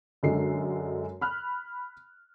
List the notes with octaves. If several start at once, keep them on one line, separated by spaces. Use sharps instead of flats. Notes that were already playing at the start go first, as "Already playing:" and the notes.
F#2 D3 G#3 C7
B5 F6 F#6